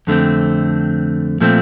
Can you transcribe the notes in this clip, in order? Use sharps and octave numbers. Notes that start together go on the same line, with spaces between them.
F2 D3 A3 C4
A#2 F3 A3 C4